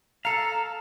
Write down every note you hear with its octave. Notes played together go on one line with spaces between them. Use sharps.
A4 F5 A#5